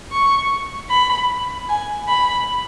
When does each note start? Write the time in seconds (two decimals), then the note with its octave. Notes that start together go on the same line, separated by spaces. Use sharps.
0.12 C#6
0.90 B5
1.69 G#5
2.08 B5